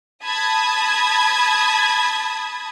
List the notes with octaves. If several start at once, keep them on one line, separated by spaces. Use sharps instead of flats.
A5 B5 D#6 G#6